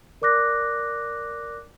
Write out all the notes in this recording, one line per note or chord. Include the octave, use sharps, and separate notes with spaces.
A#4 D5 D6 F#6 A#6